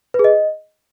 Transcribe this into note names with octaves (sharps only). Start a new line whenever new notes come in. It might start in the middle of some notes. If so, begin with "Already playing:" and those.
B4
G#4
D#5